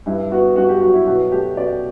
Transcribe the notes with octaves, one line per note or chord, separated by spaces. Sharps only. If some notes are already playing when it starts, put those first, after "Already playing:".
G2 E4
B3 F#4
G2 F#4
G4
F#3 F#4
E4
B2 F#4
A3 G4
B2 D5